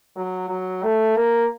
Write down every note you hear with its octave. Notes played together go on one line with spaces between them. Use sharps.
F#3
F#3
A3
A#3